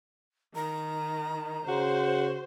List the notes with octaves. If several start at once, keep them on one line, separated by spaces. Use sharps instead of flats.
D#3 A#5
C#3 F#4 C5